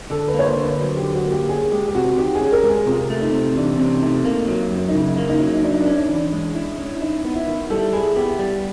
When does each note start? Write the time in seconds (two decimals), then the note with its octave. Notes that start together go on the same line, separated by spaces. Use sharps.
0.10 D3 A4
0.28 B4
0.34 A#3
0.39 C#5
0.45 C5
0.57 D3
0.62 B4
0.80 F#3 C5
0.97 G4
1.03 D3
1.14 F#4
1.25 A#3
1.31 G4
1.48 C#4 G#4
1.72 G#3 G4
1.88 G4
1.95 C3 F#4
2.18 D#3 G4
2.35 G#4
2.41 C#4
2.52 A#4
2.63 G#3
2.69 G#4
2.86 C3 F4
3.10 A3
3.21 D#4
3.33 C3
3.56 E3 D4
3.79 C3 C#4
4.02 A3 D#4
4.25 A#3
4.47 F#3
4.71 F#2
4.88 D#4
4.94 C#3 E4
5.17 A#3
5.29 D#4
5.40 F#3
5.54 D#4
5.63 D4 E4
5.73 D#4
5.80 D4
5.86 C#4
5.97 D#4
6.09 E3
6.15 D4
6.32 G#3
6.55 E4
6.78 C#4
7.01 D#4 E4
7.25 B3
7.35 E4
7.47 D#3
7.70 G3 A4
7.93 E4 G#4
8.16 B3 G4
8.39 G3